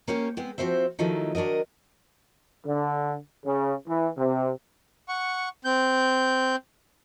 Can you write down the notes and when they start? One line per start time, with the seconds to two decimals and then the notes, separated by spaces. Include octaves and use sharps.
0.08 A#3 C#4 G4 C#5
0.37 G#3 B3 C4
0.58 F3 C4 F#4 C5 E5
0.99 D#3 F3 F#3 A3 D#4 E4
1.35 D#3 F#3 D4 A#4 D#5
2.67 D3
3.46 C#3
3.88 E3
4.18 C3
5.08 F#5 C#6
5.65 C4 G6